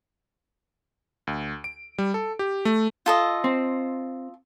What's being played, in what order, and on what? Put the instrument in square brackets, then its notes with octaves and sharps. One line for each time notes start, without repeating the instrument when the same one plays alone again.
[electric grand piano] D2
D7
G3
A4
G4
A3
[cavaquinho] F4 A4 D#5
[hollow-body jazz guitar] C4